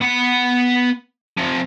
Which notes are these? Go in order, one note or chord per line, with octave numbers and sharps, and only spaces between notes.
B3 F#5
C3 F3